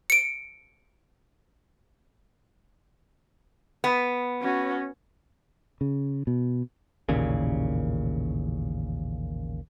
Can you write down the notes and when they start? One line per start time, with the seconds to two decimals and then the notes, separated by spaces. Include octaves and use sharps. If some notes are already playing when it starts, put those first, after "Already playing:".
0.10 C#7 D7
3.84 B3
4.41 C#4 F#4
5.81 C#3
6.27 B2
7.09 A1 D#2 A#2 C#3